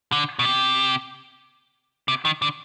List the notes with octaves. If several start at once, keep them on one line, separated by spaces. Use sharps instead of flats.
D3
B2
C3
C3
D#3
D3